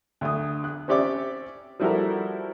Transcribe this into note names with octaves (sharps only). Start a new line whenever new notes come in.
D2 D#6
F#6
C4 C#4 G4 D5 E5 D6
F3 G3 E4 F#4 A4 A#4